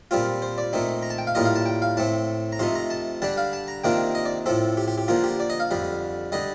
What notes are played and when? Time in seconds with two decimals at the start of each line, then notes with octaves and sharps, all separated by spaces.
0.11 A#2 G3 C4 F4
0.42 C5
0.58 D5
0.73 A#2 A3 C4 D#4
1.02 A#5
1.10 A5
1.18 G5
1.27 F5
1.35 A2 G3 A#3 F4 D#5
1.45 F5
1.56 A5
1.66 G5
1.82 F5
1.97 A2 A3 C4 A5
2.52 A#5
2.59 C3 F3 A3 D#4 C6
2.75 A#5
2.90 A5
3.22 D3 G3 D4 A5
3.37 F5
3.53 A5
3.68 A#5
3.84 C3 D#3 A#3 D4 F4 G5
4.15 D#5
4.25 D5
4.46 A2 F3 C4 A4
4.77 G4
4.88 G4
4.98 G4
5.08 D3 F3 A#3 F4
5.24 G4
5.40 D5
5.50 D#5
5.60 F5
5.71 F2 D3 G3
6.32 D3 G3 D#5